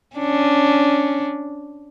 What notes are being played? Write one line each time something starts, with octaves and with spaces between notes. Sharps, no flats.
C#4 D4